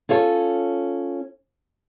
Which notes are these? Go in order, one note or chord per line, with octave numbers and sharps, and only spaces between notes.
C#4 F4 A4 C#5